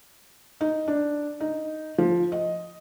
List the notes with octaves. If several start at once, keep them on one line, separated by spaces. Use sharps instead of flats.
D#4
D4
D#4
F3
D#5